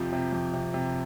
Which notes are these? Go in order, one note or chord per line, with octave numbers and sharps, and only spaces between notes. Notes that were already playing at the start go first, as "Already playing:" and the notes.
Already playing: F2 C3 F3 G4
C3
F2
C3
C3